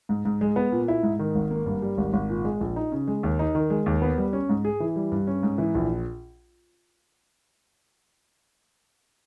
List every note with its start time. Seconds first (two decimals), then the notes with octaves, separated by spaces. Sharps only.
0.09 G#2
0.25 G#2
0.41 G#3
0.56 B3
0.72 A#2
0.88 E4
1.03 G#2
1.19 D#3
1.35 G#1
1.51 A#3
1.66 G2
1.82 G3
1.98 G#1
2.13 G#1
2.29 A#2
2.45 G#3
2.61 A#1
2.76 D#4
2.92 C#3
3.07 G#3
3.23 D#2
3.39 D#4
3.55 D#3
3.70 G#3
3.86 D#2
4.02 B3
4.18 G3
4.33 C#4
4.49 G#2
4.65 G#4
4.80 E3
4.96 G3
5.12 G2
5.27 C#4
5.43 G#2
5.58 E3
5.75 A#1